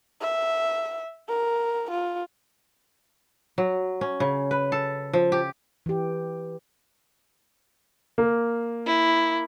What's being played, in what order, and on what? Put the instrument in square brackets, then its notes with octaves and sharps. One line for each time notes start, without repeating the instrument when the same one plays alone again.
[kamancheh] E5
A#4
F4
[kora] F#3
C#4
C#3
B4
A4
F3
G4
[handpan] E3 G4
[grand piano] A#3
[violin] E4